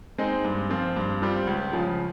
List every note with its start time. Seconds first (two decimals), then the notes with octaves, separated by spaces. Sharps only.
0.18 G#3 C4 D#4
0.44 G2
0.70 F3 C4 F4
0.96 G2
1.22 G3 C4 F4
1.47 C#2
1.73 C#3 F3